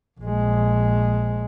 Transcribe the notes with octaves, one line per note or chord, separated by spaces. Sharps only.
A#1 G#3